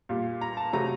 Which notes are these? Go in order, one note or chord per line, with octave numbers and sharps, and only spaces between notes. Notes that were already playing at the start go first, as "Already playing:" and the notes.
A#2 G3 A#3
A#5
A5
C3 F#3 A3 A#5